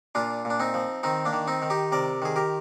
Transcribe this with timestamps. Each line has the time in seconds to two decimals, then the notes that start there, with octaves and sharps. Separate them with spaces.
0.15 A#2 D4 F4
0.45 A#2
0.50 D4
0.60 C4 D#4
0.74 F3
1.03 D#3 C4 D#4
1.25 A#3 D4
1.33 D#3
1.47 C4 D#4
1.62 D#3
1.70 D#4 G4
1.92 C3 A#4 D5
2.22 D#3 G#4
2.36 G4 A#4